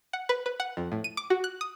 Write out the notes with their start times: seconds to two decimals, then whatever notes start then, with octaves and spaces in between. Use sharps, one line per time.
0.13 F#5
0.29 B4
0.46 B4
0.60 F#5
0.77 F2
0.92 A2
1.04 D#7
1.17 D6
1.30 F#4
1.44 F#6
1.61 D#6